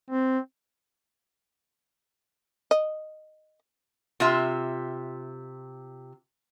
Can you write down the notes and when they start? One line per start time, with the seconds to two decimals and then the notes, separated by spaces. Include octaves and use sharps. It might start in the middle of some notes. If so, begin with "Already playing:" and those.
0.10 C4
2.71 D#5
4.20 C3 F4 E5